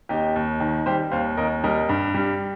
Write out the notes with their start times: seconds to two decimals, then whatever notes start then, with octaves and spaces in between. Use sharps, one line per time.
0.09 D#2 D#4 G4
0.36 D#2
0.60 D#3
0.86 G3 G4 C5
1.12 D#2 C5 F5
1.37 D#2 A#4 D#5
1.64 G3 A#4 D#5
1.89 G2
2.14 G3